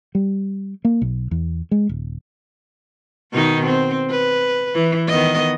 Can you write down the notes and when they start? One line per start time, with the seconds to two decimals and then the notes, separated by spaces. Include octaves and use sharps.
0.15 G3
0.85 A#3
1.02 B1
1.31 E2
1.71 G#3
1.89 D#1
3.33 B2 D#3 D#4
3.66 C4
4.10 B4
4.74 E3
5.08 D#3 B3 D#5